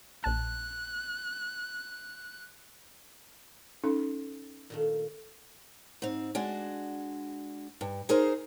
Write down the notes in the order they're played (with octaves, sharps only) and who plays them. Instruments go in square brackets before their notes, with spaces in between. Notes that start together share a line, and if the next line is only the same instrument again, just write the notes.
[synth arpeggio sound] A#1 A5 [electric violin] F#6
[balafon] C#4 D#4 A4
[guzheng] A#2 D#3 A3
[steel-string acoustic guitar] G#2 C4
G#3 D4 F#4
G2
D#4 G#4 A#4 C5